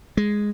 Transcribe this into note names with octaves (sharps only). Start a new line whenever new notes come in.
G#3